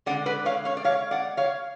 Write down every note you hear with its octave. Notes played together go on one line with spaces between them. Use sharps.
D3 G#3 D5 F#5
B4 D5
C#5 F5
C#5 F5
D5
C#5 F5
D5 F#5
C#5 F5